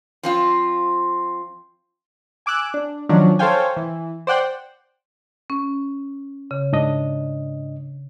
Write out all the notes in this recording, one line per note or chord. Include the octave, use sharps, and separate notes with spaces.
F3 C4 F4
G#5 D6 E6 F#6
D4
D#3 F3 F#3 C#4 D4
A4 C5 C#5 F5 G5 G#5
E3
C5 D5 F#5 G5
C#4
C#3
G#2 D4 D#5